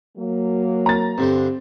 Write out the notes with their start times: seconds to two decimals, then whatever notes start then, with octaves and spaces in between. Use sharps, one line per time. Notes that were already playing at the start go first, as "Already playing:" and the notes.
0.18 F#3 A#3
0.86 A#5 A6
1.18 G2 D3 C4 C5